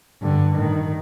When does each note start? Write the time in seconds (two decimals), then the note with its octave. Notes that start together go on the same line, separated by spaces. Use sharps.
0.22 G2 D3
0.56 A2 D#3